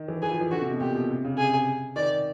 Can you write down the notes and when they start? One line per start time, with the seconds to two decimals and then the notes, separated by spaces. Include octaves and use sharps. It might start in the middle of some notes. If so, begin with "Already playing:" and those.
Already playing: D#3
0.08 E3
0.22 E3 G#4
0.31 F3
0.41 E3
0.51 D3 F#4
0.61 C3
0.71 B2
0.80 A#2 G4
0.95 B2
1.10 C3
1.24 C#3
1.38 C3 G#4
1.96 D#3 D5